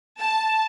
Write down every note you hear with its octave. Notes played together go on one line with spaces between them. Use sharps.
A5